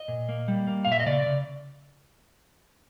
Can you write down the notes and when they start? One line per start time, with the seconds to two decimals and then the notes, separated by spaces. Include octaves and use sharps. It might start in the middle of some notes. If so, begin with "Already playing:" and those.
Already playing: D#5
0.08 A#2
0.29 A#3
0.48 G3
0.67 A#3
0.85 A#2 F5
0.92 E5
1.00 D#5
1.06 C#3 D5
1.26 C#3